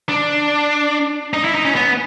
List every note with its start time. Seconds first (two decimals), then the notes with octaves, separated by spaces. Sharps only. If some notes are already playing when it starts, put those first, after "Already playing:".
0.09 D4
1.33 D#4
1.44 E4
1.55 D#4
1.65 C#4
1.75 B3